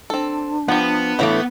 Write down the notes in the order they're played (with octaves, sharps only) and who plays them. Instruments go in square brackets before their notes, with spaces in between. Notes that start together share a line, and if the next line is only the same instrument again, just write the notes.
[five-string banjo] C4 A4 [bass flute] D4
[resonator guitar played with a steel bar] F3 [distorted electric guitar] B3 [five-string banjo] G4 F#5
[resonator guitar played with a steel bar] A2 E3 A3 [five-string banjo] C#5 F5 F#5